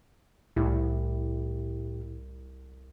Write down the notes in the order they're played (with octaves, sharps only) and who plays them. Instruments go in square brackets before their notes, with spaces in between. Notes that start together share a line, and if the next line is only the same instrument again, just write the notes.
[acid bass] C2 [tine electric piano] A2 E4 G4